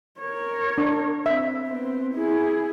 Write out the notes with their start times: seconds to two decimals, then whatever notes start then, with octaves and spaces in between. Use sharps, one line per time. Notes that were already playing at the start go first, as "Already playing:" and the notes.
0.20 A#4 C#5
0.78 D4
1.26 C4 E5
1.68 B3 C4
2.14 E4 G#4